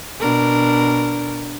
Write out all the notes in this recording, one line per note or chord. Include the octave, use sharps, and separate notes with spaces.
B2 D4 A#4